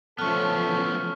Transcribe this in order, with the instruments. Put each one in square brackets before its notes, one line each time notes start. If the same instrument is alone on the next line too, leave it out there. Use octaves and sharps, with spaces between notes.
[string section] F3 C#4 [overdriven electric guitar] A3 B3 [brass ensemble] A4 A5 [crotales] C#6 F6